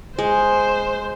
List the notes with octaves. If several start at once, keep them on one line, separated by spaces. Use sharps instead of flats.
G#3 C5